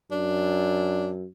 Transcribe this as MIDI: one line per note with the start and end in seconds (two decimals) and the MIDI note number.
0.11 1.26 42
0.11 1.10 62